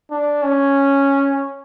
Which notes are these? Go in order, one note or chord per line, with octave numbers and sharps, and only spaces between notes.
D4
C#4